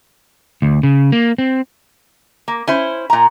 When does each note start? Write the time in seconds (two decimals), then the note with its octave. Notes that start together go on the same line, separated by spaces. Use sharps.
0.62 D2
0.83 C#3
1.12 A#3
1.38 C4
2.48 A#3
2.67 C#4 E4 C5
3.10 A#2 A#5